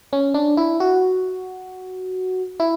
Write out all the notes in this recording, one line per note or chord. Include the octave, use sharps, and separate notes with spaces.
C#4
D4
E4
F#4
E4